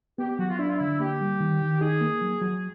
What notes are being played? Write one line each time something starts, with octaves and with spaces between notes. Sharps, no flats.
B3 G4
G4
F#3 F#4
F4
D4 E4
F4
D3 E4
A#3 G4
G3
D#3
D#3
D#4 G#4
A#3
F#3
F#3